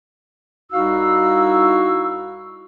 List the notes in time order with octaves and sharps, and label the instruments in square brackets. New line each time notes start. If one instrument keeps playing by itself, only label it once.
[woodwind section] C2 D#4 E4 F#4 F5 E6